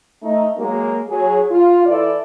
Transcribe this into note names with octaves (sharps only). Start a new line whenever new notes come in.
A3 D#4
F#3 G#3 A#3
F#3 G#4
F4
E3 E4 A4 D5